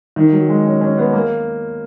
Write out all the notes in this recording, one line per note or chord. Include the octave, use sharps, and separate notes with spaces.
D#3
F#3
G#3
C#4
C#4
B3
A#3